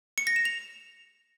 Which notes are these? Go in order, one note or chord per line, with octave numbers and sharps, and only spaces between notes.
C#7
A#6
E7
F7